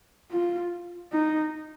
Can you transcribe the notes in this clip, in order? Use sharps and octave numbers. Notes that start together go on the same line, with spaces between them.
F4
D#4